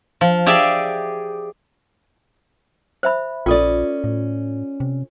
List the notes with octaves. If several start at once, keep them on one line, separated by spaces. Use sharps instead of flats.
F3
G4 G#4 D5 E5 G#5
C5 E5 B5
A#1 C#4 F4 A4 D5
A2
C3